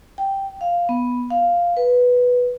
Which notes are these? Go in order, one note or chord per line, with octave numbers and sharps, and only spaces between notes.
G5
F5
B3
F5
B4